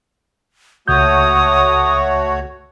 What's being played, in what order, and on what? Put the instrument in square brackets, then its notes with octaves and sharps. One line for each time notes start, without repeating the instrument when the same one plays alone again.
[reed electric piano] C#2 G6 [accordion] A3 F#4 C#5 [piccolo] D#6